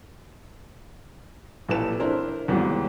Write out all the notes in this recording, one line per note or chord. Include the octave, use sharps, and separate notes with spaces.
A1 A#2 E4 A4 B4 E7
D4 E4 A#4 C5
D#2 G#2 E3 F#3 G3 B3